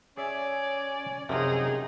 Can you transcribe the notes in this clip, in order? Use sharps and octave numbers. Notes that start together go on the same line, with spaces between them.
C#4 G#4 C#5 D5 E5
F#2 C3 F3 D#4 G#4